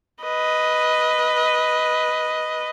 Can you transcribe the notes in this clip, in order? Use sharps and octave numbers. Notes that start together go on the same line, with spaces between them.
B4 D#5